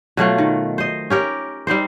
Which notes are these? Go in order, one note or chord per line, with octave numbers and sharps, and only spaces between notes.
B2 F#3 A3 F4
D#3
C5 D#5
C#4 G4 A#4
G3 C4 D#4 C5